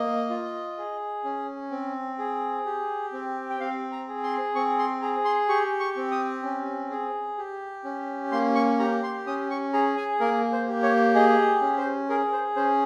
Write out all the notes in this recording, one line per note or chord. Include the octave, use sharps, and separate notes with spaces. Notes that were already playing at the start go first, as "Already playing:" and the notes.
Already playing: A#3 D#5
F4
G#4
C#4
C4
G#4
G4
C4
G5
C4 F5
A#5
G#4
C6
C4 C#6
C6
G#4 A#5
C6
G4 C#6
C#6
C4
D#6
C#4
G#4
G4
C#4
A#3 C6
C#6
G4 A#5
C6
C#4 D#6
C#6
G#4 A#5
G#5
A#3 A#4
C5
G4
C#5
G#4 D#5
C#4
C5
G#4 A#4
C5
C#4 C5